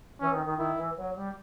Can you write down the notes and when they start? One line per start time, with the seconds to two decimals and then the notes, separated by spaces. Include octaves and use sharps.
0.20 E3 C#4
0.33 D#3
0.46 D#3
0.58 D#3 E4
0.77 E3
0.97 F#3
1.15 G3